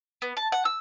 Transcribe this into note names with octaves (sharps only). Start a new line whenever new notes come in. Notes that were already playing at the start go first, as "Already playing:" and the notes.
B3
A5
F#5
E6